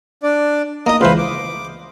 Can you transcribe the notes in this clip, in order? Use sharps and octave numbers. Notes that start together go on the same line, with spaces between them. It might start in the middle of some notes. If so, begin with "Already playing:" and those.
D4 D5
A#3 D#4 D#5 A#5 D#6
C#2 E3 B4 C5 F5
D6